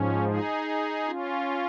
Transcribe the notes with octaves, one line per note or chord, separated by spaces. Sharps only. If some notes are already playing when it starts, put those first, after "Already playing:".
Already playing: G#2 F3 C#4
D#4 G#4
C#4 F4